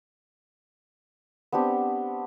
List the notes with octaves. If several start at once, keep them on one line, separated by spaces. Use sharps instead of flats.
B3 C4 D4 G4